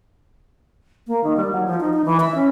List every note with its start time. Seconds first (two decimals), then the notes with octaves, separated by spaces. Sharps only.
1.07 A#3
1.24 D#3
1.37 G3
1.52 F#3
1.66 F3
1.80 D#4
1.93 D#4
2.05 E3
2.20 E5
2.35 C#4